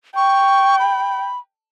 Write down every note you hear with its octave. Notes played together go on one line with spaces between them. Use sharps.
G5 C#6
B5